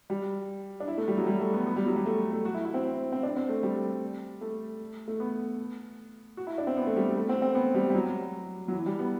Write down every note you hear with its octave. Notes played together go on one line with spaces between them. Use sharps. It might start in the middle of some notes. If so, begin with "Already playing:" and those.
G3
D4
E4
A3
G3
F#3
G3
A3
B3
B3
G3
F#3
G3
A3
A3
F#4
E4
E4
C4
C4
D4
C4
A3
G3
A3
A3
B3
F#4
E4
D4
C4
B3
A3
G3
A3
C4
C4
B3
G3
G3
F#3
F#3
E3
G3
B3